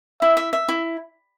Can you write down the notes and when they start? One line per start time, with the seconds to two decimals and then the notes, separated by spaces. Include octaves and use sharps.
0.22 E4 E5
0.37 E5
0.53 E5
0.68 E4